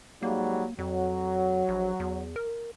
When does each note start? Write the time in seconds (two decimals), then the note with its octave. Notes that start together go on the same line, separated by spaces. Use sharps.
0.22 G#2 F#3 G3 A#3
0.79 F2 F#3
1.68 A#1
2.00 E2
2.36 A#4